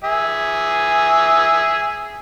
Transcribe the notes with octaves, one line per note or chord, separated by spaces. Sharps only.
G#4 E5